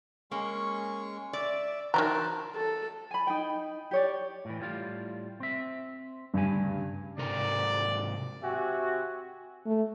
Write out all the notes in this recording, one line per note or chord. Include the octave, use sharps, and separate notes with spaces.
G#3 A#3 C#4 C#6
D5 E5
D#3 E3 F#3 C5 A5 A#5 F#6
A4
G#5 B5
D#4 G5
G4 C#5 D5
A2 E3
A2 G3 F4
C4 E5
D2 G2 C#3 G#5
G#2 C3 A#4 D5
C4 F#4 G4 E5 G#5
A3